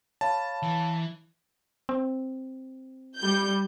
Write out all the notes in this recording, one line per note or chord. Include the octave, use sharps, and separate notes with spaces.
C#5 F5 A5 B5
E3
C4
G3 G6